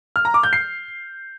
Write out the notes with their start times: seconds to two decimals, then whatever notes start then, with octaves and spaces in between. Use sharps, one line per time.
0.16 F6
0.25 A#5
0.34 D6
0.43 G6
0.53 C7